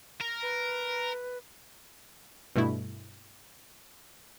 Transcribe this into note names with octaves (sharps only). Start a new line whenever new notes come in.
A#4
B4
G2 B2 A3 E4